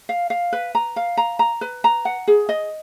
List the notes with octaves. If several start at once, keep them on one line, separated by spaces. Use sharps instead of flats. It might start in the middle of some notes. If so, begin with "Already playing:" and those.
F5
F5
B4
A#5
F5
A#5
A#5
B4
A#5
F#5
G#4
D#5